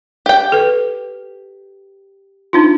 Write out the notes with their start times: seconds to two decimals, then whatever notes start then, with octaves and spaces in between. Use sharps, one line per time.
0.26 G4 G5
0.52 A4 B4
2.53 D4 D#4 F4